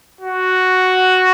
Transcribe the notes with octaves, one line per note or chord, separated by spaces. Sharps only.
F#4